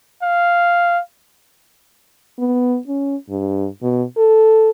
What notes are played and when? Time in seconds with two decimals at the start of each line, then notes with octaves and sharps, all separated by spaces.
0.23 F5
2.38 B3
2.87 C#4
3.29 G2
3.82 B2
4.17 A4